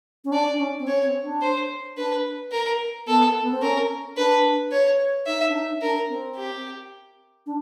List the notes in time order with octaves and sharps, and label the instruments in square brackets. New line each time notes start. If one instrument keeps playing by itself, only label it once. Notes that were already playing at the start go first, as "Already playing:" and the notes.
[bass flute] C#4
[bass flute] D4 [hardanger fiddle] D5
[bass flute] D4
C#4
C4
[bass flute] C#4 [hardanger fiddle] C#5
[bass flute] C4
D4
[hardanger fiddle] C5
[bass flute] D4 [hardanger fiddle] B4
[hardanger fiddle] A#4
[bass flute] B3 [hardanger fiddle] A4
[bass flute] B3
C4
[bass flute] C#4 [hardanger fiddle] A#4
[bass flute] D4 [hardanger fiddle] B4
[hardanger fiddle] C#5
[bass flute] D#4 [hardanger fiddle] E5
[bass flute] D4
D#4
[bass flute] D4 [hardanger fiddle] A#4
[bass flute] C4
[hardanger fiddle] G4
[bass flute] D4